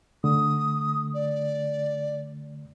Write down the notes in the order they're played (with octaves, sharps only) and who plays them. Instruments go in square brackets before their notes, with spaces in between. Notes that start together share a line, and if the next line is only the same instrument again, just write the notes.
[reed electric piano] D3 A3 [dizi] D#6
[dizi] D5